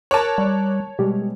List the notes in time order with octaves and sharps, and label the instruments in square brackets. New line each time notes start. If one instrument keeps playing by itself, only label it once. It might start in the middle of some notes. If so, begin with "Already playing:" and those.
[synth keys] A#4 D6 F#6 [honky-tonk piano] C#5 A5
[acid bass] G3
[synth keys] B2 G3 G#3 [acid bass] G4